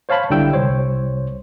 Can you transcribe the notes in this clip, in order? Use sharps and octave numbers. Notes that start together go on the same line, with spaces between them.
C5 C#5 F5 A5 B5
B1 D3 G3 E4 G5 E6
C2 C5 C#5